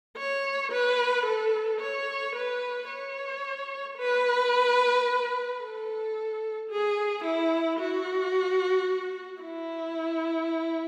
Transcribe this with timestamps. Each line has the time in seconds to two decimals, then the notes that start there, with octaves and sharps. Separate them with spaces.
0.17 C#5
0.71 B4
1.25 A4
1.81 C#5
2.35 B4
2.89 C#5
3.97 B4
5.61 A4
6.69 G#4
7.24 E4
7.79 F#4
9.42 E4